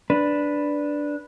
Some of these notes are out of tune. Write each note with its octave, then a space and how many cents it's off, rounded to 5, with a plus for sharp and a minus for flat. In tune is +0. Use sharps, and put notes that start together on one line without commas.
D4 +0 B4 +0